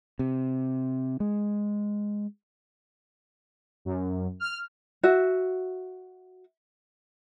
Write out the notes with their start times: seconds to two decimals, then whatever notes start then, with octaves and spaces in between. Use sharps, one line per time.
0.19 C3
1.20 G#3
3.85 F#2
4.40 F6
5.03 F#4 E5